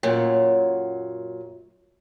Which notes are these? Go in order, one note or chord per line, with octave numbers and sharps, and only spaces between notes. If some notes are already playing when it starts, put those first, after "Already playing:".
F#2 A#2 F#3